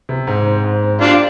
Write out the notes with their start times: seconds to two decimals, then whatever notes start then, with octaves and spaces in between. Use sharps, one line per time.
0.09 C3
0.27 G#2
0.46 C4
0.64 G#2
0.83 C4
1.01 D4 F4 G4